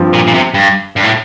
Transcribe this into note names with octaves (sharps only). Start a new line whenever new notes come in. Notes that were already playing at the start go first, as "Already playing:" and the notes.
Already playing: G2 F3 C4 F4
A#2
A#2
C3
G2
G2
A2